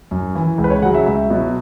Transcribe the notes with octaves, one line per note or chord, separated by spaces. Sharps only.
F#2
E3
C#2
B4
C#5
C#3 F#3 F#5
E5
C#2 E5
B2 F#3